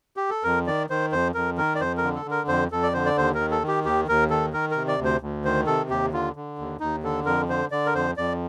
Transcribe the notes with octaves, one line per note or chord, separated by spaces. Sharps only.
G4
A4
F2 A#4
D#3 D5
D#3 C5
F2 C5
F2 A#4
D#3 A#4
D5
F2 C5
A#4
D3
A4
D3
A#4
F2 C5
F2 A4
D5
D3 C5
D5
D#2 C5
A#4
D#3
A4
D#3
G4
D#2 G4
D#2 A#4
D#3 A4
D#3 A#4
C3 A#4
D5
D2
C5
D2
D#3 C5
C3 A4
D#2 G4
D3 F4
D3
D#2
D#2 D#4
D3 A4
F2 A#4
D3 C5
D3 D5
A#4
F2 C5
F2 D5